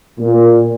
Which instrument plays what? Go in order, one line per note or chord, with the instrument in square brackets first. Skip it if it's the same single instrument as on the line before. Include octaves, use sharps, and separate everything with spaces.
[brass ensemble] A#2